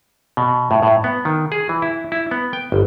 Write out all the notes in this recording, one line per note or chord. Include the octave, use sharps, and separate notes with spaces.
B2
A2
A2
B3
D#3
G#4
E3
E4
E4
B3
G5
G1